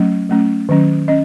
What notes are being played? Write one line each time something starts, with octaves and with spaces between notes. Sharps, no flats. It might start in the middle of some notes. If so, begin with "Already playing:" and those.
Already playing: F#3 A3 C#4
F#3 A3 C#4
D#3 F#3 C#4
C#4 D#5